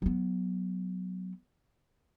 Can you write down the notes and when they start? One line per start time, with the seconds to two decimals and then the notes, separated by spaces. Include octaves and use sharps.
0.02 F#3 B3